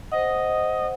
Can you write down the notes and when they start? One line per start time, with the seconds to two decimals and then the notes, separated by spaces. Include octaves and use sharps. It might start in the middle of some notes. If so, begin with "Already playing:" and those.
0.12 C5 D#5 F#5